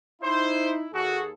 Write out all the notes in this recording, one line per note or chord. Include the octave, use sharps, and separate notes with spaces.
D#4 E4 C5
D#2 F#4 G#4 A4